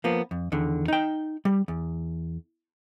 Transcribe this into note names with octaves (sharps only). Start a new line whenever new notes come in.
F3 A#3 B3
F2
E2 D3 D#3
D#4 G5
G3
E2